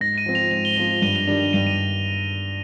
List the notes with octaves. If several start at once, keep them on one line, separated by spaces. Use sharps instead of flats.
G#2 A#6
D#7
F3 C4
F7
G#2 F7
G7
F3 C4 F7
G2 D#7
F7
D#3 G3 D4 F7
F7
G2 D#7
D#7